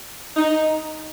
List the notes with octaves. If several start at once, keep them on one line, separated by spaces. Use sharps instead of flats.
D#4